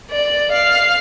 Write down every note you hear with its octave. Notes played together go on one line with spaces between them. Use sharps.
D5
F5